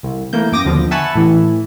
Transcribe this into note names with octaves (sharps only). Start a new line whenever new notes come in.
C2
E3 A3 A#3 G6
F#2 G5 D6 D#6 A#6
D#2 B2 D3 F3
E5 F#5 G#5 A5 B5 C#6
A2 E3